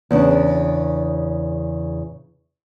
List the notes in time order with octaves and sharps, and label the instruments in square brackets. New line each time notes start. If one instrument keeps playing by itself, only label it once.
[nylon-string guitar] E2 C#3 D4